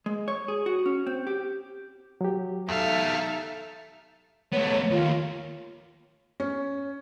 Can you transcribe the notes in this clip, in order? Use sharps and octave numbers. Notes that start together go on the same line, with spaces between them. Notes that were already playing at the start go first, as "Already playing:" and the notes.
G#3
C#5
G#4
F#4
C#4
C4
G4
F#3 G4
E2 D#4 A4 E5 F5
A3 B3 C#5
D#2 F4
C#4